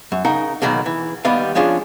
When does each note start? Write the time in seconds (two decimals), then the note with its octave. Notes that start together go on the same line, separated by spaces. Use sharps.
0.12 F#2
0.25 C#3 D#4 A#4 F#5
0.62 B2 D#3 F#3 G#3 A#3
0.86 E3
1.25 D#2 G3 B3 G4 D#5 F5
1.55 F3 G#3 C#4 D4 F4